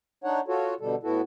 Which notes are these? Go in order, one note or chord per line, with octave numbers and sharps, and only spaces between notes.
D4 D#4 C#5 F#5
F4 F#4 A4 C#5
B2 D3 G3 A4
A2 B3 E4 F#4 A4